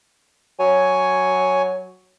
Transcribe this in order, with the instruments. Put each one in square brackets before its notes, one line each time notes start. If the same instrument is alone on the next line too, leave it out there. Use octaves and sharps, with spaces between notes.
[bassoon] F#3 [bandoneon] C#5 G#5